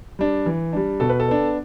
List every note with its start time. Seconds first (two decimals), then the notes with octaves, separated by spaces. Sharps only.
0.19 G3 D4
0.46 E3
0.73 G3 D4
1.00 B2 A4
1.09 B4
1.20 A4
1.28 B3 D4